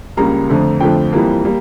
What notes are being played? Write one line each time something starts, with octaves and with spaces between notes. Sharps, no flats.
C#2 C#3 G3 A#3 A#5
F2 D3 F3 A3
F2 D3 F3 A3 G5
F2 E3 G3 A#3
G3 A#3